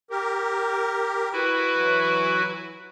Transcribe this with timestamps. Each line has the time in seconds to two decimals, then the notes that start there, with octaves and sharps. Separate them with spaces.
0.11 G4 A#4
1.33 E4 F#4 B4
1.76 E3 F#3